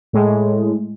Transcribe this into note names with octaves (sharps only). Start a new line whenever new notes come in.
A2 G#3